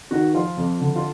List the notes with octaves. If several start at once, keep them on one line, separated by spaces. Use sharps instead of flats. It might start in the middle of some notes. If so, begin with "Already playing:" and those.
D#3 F#4
F3 F4
F2
D3
F4